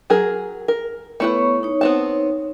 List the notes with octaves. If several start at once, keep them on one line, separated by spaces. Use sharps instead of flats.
F#3 G#4 A#4
A#4
A3 B3 E4 B4 C#5 C#6
D#4 C#5
B3 C4 A5